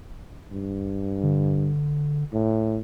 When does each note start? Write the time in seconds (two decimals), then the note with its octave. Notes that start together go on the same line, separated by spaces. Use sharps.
0.52 G2
1.23 D3
2.32 A2